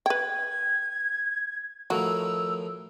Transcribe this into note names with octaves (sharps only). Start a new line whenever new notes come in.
B4 G5 G#6
A2 D#3 F3 F#4 E6